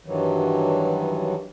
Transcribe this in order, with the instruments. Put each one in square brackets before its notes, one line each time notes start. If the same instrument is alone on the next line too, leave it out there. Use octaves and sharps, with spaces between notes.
[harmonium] G2 D#3 E3 F#3